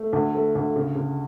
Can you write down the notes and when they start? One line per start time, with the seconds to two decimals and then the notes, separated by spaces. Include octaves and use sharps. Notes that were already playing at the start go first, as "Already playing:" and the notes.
Already playing: A3
0.13 D2
0.35 A3
0.55 D2
0.76 C#3
0.95 C#3